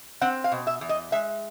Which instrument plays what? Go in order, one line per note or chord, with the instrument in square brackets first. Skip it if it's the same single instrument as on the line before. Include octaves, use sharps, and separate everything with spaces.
[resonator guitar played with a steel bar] C4 F#5
F5
B2
E5
E2
D#5
G#3 E5